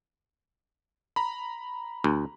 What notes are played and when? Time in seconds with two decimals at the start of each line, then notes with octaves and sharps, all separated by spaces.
1.16 A#5 B5
2.04 D2